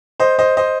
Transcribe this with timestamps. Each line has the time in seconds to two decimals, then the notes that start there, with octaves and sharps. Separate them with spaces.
0.20 C5 D#5
0.39 C5 D#5
0.57 C5 D#5